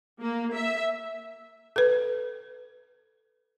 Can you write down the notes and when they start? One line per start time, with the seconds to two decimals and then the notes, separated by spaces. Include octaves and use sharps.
0.21 A#3
0.55 E5
1.76 A4 B4